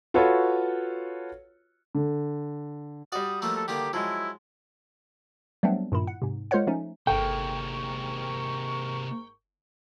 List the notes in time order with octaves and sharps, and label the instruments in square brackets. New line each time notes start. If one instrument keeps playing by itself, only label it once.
[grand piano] F4 F#4 A4 B4 C#5
D3
[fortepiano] G3 F#4 [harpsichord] D5 [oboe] D#6
[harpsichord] F3 A3 A#3 [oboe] E6
[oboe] A4
[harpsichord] D3 D#3 A#3 [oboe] G4
[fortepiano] F3 G#3 [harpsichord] F#3 [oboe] E4
[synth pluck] F#3 G3 A3 B3 C4 D4
G2 A#2 D#3 E4
F#5
G#2 C3
G#3 F4 A#4 C5 C#5 F#5
F3 A3 C#4 D#4
[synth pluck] G1 A4 [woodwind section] G#2 A#4 C#6 [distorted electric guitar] C3 A#3 [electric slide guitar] G5